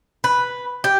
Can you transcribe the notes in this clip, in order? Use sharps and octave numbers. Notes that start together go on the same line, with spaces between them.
B4
G4